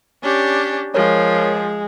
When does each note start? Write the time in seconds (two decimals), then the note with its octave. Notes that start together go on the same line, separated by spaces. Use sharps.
0.23 C#4 D4 G4
0.94 F3 G#3 A#4 C#5